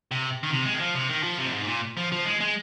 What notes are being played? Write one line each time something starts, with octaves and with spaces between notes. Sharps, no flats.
C3
D#3
C3
G#3
D#3
F3
C3
D#3
F3
C3
F2
G#2
A#2
F3
F3
G#3
G#3